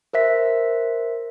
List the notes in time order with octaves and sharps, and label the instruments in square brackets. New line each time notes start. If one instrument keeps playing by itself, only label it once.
[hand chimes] A#4 C5 E5 B6